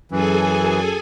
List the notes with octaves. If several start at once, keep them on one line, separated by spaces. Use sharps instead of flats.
F#2 E3 G#4 A4 G#5